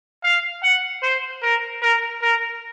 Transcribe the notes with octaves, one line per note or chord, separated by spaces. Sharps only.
F5
F#5
C5
A#4
A#4
A#4